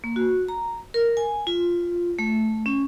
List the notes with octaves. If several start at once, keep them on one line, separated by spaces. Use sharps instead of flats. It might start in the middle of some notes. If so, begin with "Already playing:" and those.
A#3
F#4
A#5
A#4
G#5
F4
A3
C#4